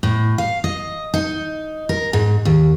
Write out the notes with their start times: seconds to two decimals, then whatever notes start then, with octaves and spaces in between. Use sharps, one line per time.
0.03 A2
0.38 F5
0.64 D#5
1.14 D#4
1.89 A#4
2.13 G#2
2.45 D#2